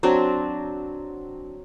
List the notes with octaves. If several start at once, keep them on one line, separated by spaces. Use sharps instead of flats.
F#3 C4 D4